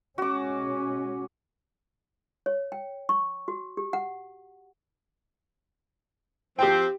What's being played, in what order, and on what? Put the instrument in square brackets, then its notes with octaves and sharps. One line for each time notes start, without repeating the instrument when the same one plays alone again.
[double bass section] B2 G#3 C#4 [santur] F#4 D6
[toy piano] C#5
G5
C#6
F#4
G4
F#5
[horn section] F3 C4 [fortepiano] G4 G5